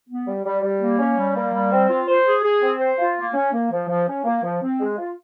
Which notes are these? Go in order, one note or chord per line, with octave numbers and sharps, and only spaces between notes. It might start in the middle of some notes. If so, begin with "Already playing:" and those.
B3
G3
G3
G3
A#3
C#4
G3
A#3
G3
C4
F4
C5
G#4
G#4
C4
C5
F4
A#3
C#4
A#3
F3
F3
C#4
A#3
F3
C4
G#3
F4